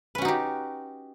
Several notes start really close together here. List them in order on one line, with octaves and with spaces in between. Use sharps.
B4 C#4 F#4 D#4 G4